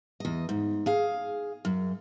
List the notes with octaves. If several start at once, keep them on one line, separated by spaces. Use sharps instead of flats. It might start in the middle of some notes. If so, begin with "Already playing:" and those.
E2 D#5
G#2
G#4 F5
F#2